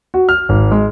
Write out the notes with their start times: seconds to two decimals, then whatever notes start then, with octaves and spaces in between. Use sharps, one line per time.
0.14 F#4
0.29 F6
0.49 G#1
0.71 G#3